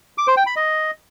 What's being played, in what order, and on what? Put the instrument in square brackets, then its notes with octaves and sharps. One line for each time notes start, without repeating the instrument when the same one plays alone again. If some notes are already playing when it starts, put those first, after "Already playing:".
[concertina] D6
C5
G5
B5
D#5